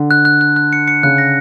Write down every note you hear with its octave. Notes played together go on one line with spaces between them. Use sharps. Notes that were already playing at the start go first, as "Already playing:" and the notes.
Already playing: D3
F#6
F#6
F#6
F#6
C#7
C#7
C#3 F#6
A#6